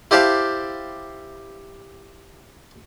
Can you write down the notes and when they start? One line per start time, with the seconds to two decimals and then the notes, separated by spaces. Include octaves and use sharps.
0.11 E4 G4 C5 D5 F5 A5